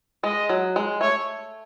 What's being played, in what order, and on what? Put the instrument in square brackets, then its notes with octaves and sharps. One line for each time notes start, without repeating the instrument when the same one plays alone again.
[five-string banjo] G#3 [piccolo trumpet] D#5
[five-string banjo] F#3
G#3
[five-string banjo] A3 [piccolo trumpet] C#5